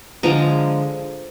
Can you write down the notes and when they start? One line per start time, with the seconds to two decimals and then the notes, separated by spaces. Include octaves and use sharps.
0.23 D3 F3 G#3 A#5